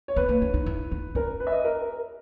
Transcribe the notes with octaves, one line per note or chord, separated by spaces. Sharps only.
C#5
B3 B4
A#3
C#4
D#4
E4
D#4
C#4 A#4
B4
E5
D#5
A#4
A#4